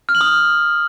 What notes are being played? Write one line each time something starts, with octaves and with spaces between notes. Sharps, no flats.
F6
F#7
D#6